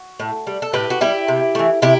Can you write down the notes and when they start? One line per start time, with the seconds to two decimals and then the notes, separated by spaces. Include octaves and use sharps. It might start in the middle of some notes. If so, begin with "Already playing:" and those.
Already playing: F#4
0.20 A2
0.47 G3
0.62 A4
0.73 A2 G4 B4
0.90 F#4
1.01 G3 E4 G4
1.28 C3
1.55 E3 A3
1.82 C3 E4 G4